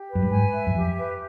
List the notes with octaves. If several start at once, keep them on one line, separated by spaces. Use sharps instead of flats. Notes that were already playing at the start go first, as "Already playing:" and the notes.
Already playing: G4
B4
F#2
G2
G#2 G#5
E5
F#2
F2 G4
B4